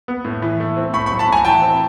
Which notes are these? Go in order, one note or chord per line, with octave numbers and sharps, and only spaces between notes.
B3
A2
E3
A3
C4
A2 B5 C#6
B5 C#6
F#3
A5 B5
A2 G#5 A#5
E3 G5 A5
C4